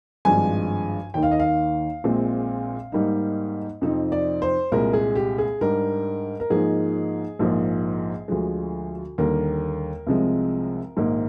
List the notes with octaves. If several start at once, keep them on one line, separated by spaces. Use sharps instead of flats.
G#1 G2 F3 G#3 D4 G#5
D#2 D#3 A#3 D#4 G5
F5
D#5
F5
A#1 A#2 G#3 C4
G#2 G3 A#3 D#4
F2 C3 F3 C4 D#4
D5
C5
C2 A#2 G#3 A#4
G#4
G4
G#4
G#2 G3 D4 A#4
A#4
G#2 F3 A#3 D#4 G#4
A#1 G#2 F3 A#3
D2 D3 F3 G#3
D#2 D3 G3 A#4
C2 C3 F3 G#3
A#1 G#2 D#3 A#3